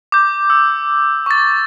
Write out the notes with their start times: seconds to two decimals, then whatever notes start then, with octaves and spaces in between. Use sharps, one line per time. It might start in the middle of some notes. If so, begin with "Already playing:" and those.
0.12 D6 G6
0.50 E6
1.26 C#6 A6